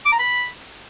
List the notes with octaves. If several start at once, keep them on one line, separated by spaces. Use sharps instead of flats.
D6
A#5
B5